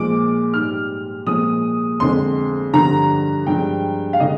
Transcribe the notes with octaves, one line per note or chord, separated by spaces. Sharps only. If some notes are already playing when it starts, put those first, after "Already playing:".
Already playing: A#2 F3 G#3 D6
G#2 G3 F6
A#2 F3 G#3 D#6
F2 D3 G#3 C6
G2 D3 F3 A#5
G2 F3 G#3 G5
F5
D3 G#3 D#5